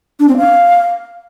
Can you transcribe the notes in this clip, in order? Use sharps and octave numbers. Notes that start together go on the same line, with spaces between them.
D4
C4
F5